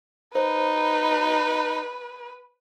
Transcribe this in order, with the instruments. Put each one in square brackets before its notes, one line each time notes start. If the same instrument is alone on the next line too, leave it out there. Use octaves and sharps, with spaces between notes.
[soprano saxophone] D#4 [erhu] B4 [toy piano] C5